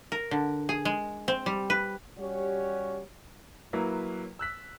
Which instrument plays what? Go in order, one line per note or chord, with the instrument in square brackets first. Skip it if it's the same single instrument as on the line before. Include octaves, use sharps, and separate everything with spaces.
[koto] A#4
D3
G#4
G#3
C4
G3
B4
[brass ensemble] G3 C#4 F#4 G4 C#5
[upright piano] F#3 A#3 E4 B4
E6 F#6 B6